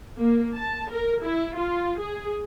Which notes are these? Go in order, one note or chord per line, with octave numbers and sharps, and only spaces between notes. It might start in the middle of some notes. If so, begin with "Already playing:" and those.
A#3
A5
A#4
E4
F4
G#4